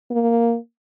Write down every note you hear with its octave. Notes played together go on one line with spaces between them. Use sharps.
A#3